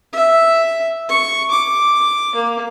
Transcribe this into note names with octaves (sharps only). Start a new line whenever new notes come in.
E5
C#6
D6
A#3